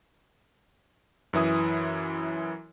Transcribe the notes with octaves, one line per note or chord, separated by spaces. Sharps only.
F#2 E3 E4 D#6